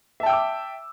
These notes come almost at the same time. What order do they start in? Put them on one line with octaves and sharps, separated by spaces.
E5 A5 G5 E6 D6